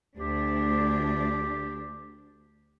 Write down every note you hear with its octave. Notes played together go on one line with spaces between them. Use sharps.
D2 D4 G4